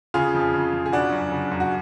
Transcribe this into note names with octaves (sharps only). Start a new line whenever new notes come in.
C#3 F4 G#4
F2
C#3
F2
G#4
C#3 D4 F#4
F#2
C#3
F#2
F#4